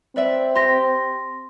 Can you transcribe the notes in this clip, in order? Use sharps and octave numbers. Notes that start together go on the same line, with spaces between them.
C4 B4 D5 E5
G4 C6 A#6